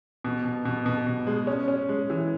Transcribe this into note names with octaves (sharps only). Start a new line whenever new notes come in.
B2
B2
B2
B2
B2
G#3
C#4
C#4
G#3
E3